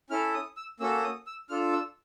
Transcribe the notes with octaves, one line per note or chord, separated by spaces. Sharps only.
C#4 E4 A4 F6
D#6
E6
A#3 C#4 F#4 A4 E6
D#6
E6
D4 F4 A4 F6
E6